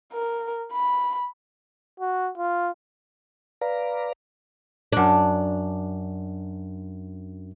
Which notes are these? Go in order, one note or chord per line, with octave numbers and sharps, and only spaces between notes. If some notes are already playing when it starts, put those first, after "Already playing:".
A#4
B5
F#4
F4
B4 D5 F5 A#5
F#2 D4